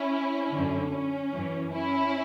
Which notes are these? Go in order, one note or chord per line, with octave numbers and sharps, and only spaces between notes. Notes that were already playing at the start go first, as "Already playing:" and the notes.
Already playing: C#4 E4
F#2 D3
C#4
F#2 E3
C#4 E4